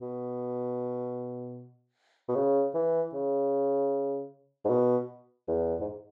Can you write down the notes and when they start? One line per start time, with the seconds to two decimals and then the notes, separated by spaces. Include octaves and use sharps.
0.01 B2
2.28 B2
2.35 C#3
2.74 E3
3.13 C#3
4.65 G#2
4.70 B2
5.48 E2
5.80 G#2